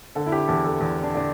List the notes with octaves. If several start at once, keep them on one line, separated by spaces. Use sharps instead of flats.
D3 A4
E4
G4
E2 A4
A4
E2
D4
D3 D4